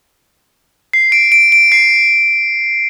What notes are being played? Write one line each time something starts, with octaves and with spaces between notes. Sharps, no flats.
C7
D7
D7
D7
C7